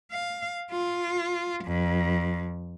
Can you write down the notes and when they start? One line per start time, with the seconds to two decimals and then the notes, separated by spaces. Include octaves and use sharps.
0.12 F5
0.72 F4
1.65 F2